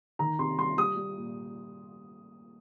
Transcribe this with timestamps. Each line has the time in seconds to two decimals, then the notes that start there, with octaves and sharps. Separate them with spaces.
0.19 D#3 A#5
0.39 C3 C6
0.58 G3 C6
0.78 G3 D#6
0.96 G3
1.17 A#2